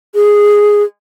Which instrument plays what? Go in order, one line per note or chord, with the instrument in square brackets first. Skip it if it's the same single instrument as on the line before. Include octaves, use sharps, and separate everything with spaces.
[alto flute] G#4